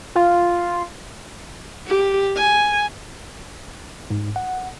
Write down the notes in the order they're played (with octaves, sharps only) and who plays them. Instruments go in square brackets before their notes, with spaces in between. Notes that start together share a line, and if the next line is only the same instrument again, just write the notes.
[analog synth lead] F4
[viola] G4
G#5
[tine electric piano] G#2
F#5